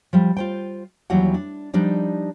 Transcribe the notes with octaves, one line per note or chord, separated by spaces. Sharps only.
F3 G3
F4 C5 G5
D#2 E3 F#3 G3 F#5
D4
F3 G3 D4 D#4